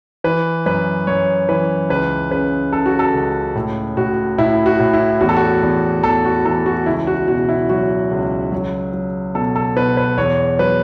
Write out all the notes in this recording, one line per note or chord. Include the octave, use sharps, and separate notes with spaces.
E3 B4
F#2 B4
F#2 C#5
E3 B4
C#2 B4
C#3 B4
C#3 A4
F#4
A4
C#2
A2
A2 F#4
A2 E4
F#4
A2
E4
E2 F#4
A4
F#4
E2
E2 A4
F#4
E3 A4
F#4
C#2 E4
F#4
B2 F#4
E4
F#3 F#4
C#2
F#3
F#3
B2 A4
A4
B2 B4
B4
E2 C#5
F#3 B4